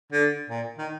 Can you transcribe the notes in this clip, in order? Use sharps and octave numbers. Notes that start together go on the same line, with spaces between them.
D3
A#2
D#3